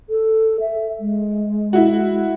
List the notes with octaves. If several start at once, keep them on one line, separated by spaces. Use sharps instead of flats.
A4
E5
G#3
E4 F#4